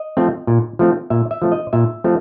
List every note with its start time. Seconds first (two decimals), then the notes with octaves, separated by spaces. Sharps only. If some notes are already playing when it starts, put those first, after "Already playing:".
Already playing: D#5
0.17 F3 A3 C4
0.47 A#2
0.79 F3 A3 C4
1.10 A#2 E5
1.31 E5
1.42 F3 A3 C4
1.52 D#5
1.73 A#2 E5
2.04 F3 A3 C4